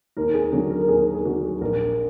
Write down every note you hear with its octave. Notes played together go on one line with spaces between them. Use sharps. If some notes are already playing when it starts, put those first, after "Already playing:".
D#2 A#4
G#4
D3 F#3 G#4
A#4
A#4
D#2 G#4
A#4
G#4
D3 F#3 F#4
G#4
A#1 A#4
A#4